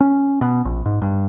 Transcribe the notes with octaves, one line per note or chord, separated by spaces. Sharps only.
C#4
B2
A#1
G#2
G2